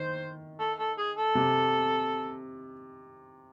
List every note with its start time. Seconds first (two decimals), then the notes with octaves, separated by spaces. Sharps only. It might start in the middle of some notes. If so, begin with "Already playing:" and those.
Already playing: D#3 C5
0.59 A4
0.79 A4
0.98 G#4
1.17 A4
1.35 C3